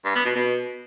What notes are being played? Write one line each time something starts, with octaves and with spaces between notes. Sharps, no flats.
G2
B3
B2
B2